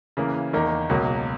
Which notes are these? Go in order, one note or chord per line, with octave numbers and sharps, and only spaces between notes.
C#3 E3 A#3
E2 D#3 A#3 D#4
C#2 B2 F#3 A#3